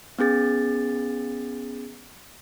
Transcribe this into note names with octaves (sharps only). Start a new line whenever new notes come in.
B3 C#4 G#4 A6